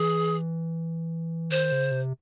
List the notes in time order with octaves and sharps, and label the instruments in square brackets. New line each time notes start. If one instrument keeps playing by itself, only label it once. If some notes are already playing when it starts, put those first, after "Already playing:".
Already playing: [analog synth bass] E3 [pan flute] G#4
[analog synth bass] D#3 [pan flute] C5
[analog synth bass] C#3
C3